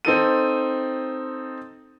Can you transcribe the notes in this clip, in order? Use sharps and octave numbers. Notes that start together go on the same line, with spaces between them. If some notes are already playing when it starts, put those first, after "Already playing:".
C4 D#4 A4 D#7